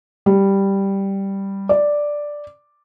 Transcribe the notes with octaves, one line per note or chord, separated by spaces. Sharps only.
G3
D5